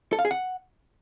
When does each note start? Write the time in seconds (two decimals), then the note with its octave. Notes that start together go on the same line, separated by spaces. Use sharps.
0.13 A4
0.19 F5
0.25 G#4
0.31 F#5